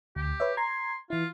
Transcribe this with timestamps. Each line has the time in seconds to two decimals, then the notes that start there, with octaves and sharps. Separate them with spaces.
0.16 D2 G4
0.40 B4 C#5 E5
0.57 A#5 C6 G#6
1.10 E3 E4 F4